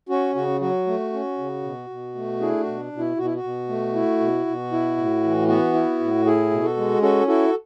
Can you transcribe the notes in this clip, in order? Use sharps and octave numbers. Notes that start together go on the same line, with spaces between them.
C#4 F#4
C#3 F#4
F#3 F#4
A3
C#4
C#3
B2
B2
A3
D4 E4 G#4
F#4
B2
B2
E4
B2 F#4
E4
F#4
B2
A3
E4
B2
B2
E4
A2
E3
B3 F#4
E4
A2
E4 G#4
B2
F#4 A4
G#3
C#4 F#4 A4
E4 F#4 A4